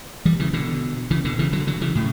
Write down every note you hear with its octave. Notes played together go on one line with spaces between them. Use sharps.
E3 G3
C#3 E3
B2 D3
C#3 E3
B2 D3
C#3 E3
D3 F#3
D3 F#3
C#3 E3
A2 C#3